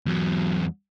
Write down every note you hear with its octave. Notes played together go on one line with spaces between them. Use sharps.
E2 F#3